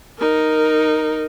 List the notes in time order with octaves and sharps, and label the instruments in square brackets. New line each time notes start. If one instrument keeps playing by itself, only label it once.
[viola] D#4 A#4